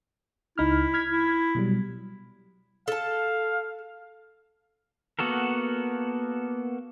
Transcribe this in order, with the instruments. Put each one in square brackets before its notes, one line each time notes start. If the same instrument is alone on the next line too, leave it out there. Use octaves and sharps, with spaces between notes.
[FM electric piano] C#2 D#4 F6 [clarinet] E4
[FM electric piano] F6 G#6 B6
[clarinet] E4
[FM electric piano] B2 F#3 G3
[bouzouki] A4 A5 [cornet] F5
[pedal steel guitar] A#3 B3 F#4 A4 A#4